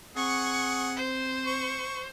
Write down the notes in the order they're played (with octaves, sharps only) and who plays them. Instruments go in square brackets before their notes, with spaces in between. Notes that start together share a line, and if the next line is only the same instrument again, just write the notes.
[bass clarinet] C4 [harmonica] G#4 F#5 [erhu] C#6
[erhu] C5
[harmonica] C#6